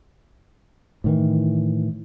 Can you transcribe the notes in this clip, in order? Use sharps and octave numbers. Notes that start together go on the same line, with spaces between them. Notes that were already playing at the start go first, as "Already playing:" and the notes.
A2 D#3 E3